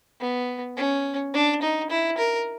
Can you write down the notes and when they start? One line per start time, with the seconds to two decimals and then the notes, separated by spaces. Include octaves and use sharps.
0.20 B3
0.77 C#4
1.34 D4
1.62 D#4
1.90 E4
2.18 A#4